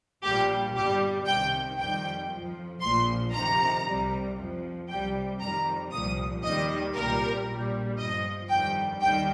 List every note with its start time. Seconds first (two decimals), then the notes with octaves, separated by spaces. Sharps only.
0.23 A#1 A#2 G3 G4
0.74 G1 G2 G3 G4
1.26 C2 C3 D#3 G5
1.78 F2 D#3 G3 G5
2.30 F2 F3
2.81 A#1 A#2 F3 C6
3.33 F2 C3 D#3 A#5
3.85 C2 C3 G3
4.37 F2 F3
4.88 C2 C3 G3 G5
5.40 F2 D#3 G3 A#5
5.91 C2 A#2 F3 D#6
6.42 D#2 D#3 G3 D#5
6.94 C2 A#2 G3 A#4
7.46 A#1 A#2 G3
7.98 G1 G2 F3 D#5
8.49 G1 F2 D#3 G3 G5
9.01 D#2 D#3 G3 G5